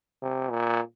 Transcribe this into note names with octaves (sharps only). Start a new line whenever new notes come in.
C3
A#2